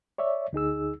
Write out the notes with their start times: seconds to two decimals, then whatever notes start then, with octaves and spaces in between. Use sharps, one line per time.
0.18 C#5 D5 E5
0.53 D2 D#4 G#4 E6